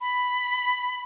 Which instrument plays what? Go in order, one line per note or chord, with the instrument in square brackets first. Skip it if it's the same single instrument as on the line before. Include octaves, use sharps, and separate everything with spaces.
[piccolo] B5